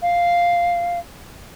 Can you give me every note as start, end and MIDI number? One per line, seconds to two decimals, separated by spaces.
0.02 0.99 77